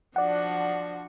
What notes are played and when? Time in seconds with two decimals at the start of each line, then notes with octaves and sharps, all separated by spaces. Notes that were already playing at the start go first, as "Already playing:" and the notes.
0.16 F3 D4 F#4 D5 F#5